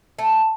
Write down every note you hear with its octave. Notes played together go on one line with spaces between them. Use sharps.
A3